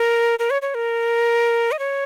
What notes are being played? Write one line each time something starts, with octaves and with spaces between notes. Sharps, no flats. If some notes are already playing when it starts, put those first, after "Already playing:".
Already playing: A#4
A#4
C#5
C#5
A#4
D#5
C#5